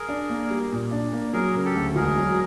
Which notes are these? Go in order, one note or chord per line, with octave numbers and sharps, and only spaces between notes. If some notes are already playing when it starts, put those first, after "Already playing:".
Already playing: G#4 A#4
D4
A#3
G3
A#2
D4
A#3
F#3 G#4 A#4
C#3
G4 A4
D2
E1 G#4 A#4
F#3